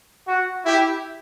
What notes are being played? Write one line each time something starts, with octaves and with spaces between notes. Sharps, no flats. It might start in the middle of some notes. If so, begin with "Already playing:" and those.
F#4
E4 G4